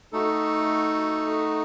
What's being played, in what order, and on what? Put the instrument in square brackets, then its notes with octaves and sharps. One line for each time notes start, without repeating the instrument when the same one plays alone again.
[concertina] A3 D#4 F#4 A4